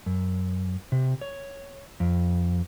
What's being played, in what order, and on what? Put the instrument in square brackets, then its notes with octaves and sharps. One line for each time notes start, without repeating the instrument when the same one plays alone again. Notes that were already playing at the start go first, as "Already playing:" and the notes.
[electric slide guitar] F#2
C3
C#5
F2